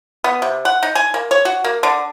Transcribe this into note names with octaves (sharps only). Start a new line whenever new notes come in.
B3
C3
F#5
D#4
G#5
A#3
C#5
F#4
A#3
D3